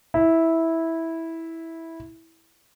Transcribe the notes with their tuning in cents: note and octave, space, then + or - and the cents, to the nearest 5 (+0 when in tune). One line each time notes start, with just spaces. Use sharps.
E4 -10